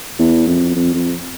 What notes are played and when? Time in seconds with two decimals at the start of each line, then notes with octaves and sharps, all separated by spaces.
0.19 E2
0.47 F2
0.76 F2
0.94 F2